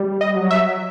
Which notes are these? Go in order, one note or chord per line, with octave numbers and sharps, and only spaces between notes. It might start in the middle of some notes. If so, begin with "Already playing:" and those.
Already playing: G3
D#5
F#3
E5